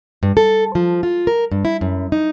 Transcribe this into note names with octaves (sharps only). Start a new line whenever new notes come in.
G2
A4
F3
F4
A#4
G2
E4
F#2
D#4